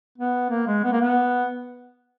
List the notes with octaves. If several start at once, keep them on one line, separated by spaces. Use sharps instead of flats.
B3
A#3
G#3
B3
A#3
B3